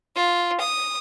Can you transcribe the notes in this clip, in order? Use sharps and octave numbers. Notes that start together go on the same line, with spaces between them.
F4
D#6